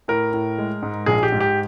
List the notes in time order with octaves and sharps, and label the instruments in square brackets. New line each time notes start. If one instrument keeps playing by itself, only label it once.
[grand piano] A2 A#4
A2
G#3
G#2
A#1 G#4
G4
G#2
G4